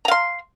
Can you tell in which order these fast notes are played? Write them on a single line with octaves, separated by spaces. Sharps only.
A#5 F5 C6